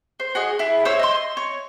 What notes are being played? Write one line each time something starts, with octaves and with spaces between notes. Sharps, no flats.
C5
F#4 G#4 D#5
E4 G#4
C5 C#5 E6
D#5 C6
C#5